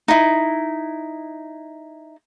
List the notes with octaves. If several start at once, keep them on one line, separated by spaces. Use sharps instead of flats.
D#4 E4